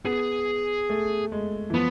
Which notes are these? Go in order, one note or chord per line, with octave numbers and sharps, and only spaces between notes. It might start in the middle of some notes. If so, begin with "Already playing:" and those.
B3 G#4
A3
G#3
E3
F3 B3